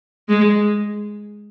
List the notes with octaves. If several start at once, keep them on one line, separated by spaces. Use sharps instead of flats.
G#3